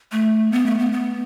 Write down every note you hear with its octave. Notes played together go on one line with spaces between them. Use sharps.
A3
B3
A3
B3
B3